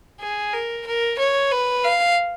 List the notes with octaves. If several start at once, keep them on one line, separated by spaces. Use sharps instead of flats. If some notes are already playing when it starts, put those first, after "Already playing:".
G#4
A#4
A#4
C#5
B4
F5